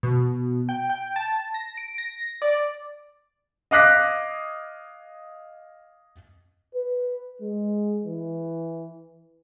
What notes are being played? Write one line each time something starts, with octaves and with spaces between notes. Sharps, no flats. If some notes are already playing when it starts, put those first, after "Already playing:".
B2
G5
G5
A5
A#6
D7
A#6
D5
D#5 F5 D6 F#6 A#6 B6
B4
G#3
E3